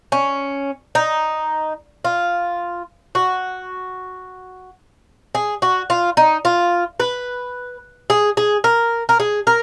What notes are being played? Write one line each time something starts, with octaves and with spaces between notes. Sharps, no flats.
C#4
D#4
F4
F#4
G#4
F#4
F4
D#4
F4
B4
G#4
G#4
A#4
A#4
G#4
A#4